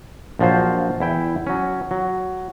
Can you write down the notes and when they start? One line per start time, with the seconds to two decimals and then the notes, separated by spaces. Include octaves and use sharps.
0.39 A#1 F3 F#3 F4 C5
1.00 E2 E4 G5
1.47 F#3 C#4
1.91 F#3